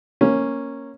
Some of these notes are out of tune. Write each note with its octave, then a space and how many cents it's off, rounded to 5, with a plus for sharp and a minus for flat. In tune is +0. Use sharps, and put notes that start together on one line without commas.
A#3 +0 C#4 -10